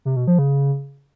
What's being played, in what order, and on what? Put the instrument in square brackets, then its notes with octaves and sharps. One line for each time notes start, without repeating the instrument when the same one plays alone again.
[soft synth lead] C3
B2
F3
C#3